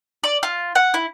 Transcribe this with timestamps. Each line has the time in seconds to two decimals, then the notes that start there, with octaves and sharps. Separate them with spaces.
0.23 D5
0.43 F4
0.75 F#5
0.94 E4